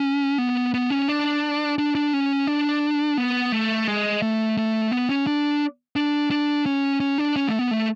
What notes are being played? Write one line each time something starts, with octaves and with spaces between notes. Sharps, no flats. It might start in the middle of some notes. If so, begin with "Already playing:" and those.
Already playing: C#4
B3
B3
C#4
D4
D4
D4
C#4
D4
B3
A3
G#3
A3
A3
B3
C#4
D4
D4
D4
C#4
C#4
D4
C#4
A3
B3
A3